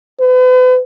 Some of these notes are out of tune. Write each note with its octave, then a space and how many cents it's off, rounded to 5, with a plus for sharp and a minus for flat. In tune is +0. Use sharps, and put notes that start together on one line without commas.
B4 +40